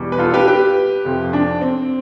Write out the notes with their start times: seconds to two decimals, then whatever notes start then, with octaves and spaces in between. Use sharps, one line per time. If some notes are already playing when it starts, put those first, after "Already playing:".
Already playing: E2 B2 G3
0.12 B4
0.19 F4 A4
0.33 G4 B4
0.47 G4 B4
1.05 F2 C3 F3
1.33 D4
1.61 C4